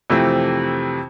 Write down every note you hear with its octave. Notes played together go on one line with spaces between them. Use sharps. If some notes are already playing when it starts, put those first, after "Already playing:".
F2 C3 E3 A3 C4